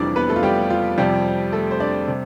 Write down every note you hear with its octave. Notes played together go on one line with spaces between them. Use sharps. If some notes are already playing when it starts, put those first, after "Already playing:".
Already playing: F1 F2 E3 G3 D4 D5
B3 B4
A3 A4
F4
G3 G4
F4
F2 C3 F3 G3 G4
A3 A4
C5
D4 D5
C3 G3